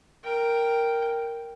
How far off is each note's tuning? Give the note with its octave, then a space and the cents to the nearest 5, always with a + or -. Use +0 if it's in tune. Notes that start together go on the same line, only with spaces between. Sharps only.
A#4 +0 G5 +0